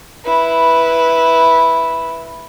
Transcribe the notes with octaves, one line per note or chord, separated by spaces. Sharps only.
E4 B4